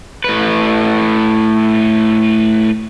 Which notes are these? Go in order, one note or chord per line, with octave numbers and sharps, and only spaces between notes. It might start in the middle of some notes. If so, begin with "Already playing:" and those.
A2 B4